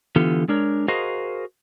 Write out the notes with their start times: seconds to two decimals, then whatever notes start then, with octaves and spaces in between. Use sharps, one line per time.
0.16 D3 E3 B3 F4 G4 A4
0.48 G#3 D4 A#4 C#5
0.88 F#4 G#4 A#4 C5 D#5 F5